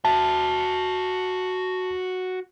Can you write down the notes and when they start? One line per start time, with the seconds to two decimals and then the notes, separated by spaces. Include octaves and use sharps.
0.05 F#4 E5 A5